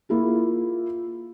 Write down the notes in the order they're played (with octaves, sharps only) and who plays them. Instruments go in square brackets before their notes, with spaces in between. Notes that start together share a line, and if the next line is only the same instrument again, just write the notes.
[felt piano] A#3 E4 F4 G#4